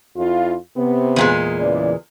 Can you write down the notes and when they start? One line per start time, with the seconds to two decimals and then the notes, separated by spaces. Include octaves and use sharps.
0.17 F2 E4 F4
0.76 C3 B3
1.16 E2 A#2 G#3
1.60 C#3 E3 D5